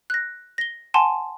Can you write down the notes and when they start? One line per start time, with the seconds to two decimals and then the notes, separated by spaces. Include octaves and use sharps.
0.10 F#6 A#6
0.58 A#6 G7
0.94 F#5 G#5 A5 C6